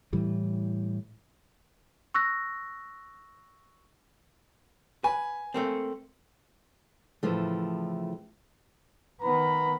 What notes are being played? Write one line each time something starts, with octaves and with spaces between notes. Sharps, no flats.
A2 E3 G3
C#6 E6 F#6 A#6
B4 G#5
A3 A#3 C4
A2 C#3 E3 F3 A3
D#3 B3 A#5 B5